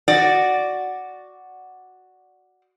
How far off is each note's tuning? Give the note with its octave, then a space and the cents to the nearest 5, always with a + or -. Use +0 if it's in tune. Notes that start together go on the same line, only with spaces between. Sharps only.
F#4 +0 D5 +0